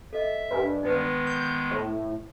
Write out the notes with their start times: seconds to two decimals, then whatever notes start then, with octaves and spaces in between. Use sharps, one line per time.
0.13 A4 D#5 E5
0.51 G2 A#4 B4 G#5
0.83 D#3 G#3 B3 D#4 B4
1.27 G6
1.71 A2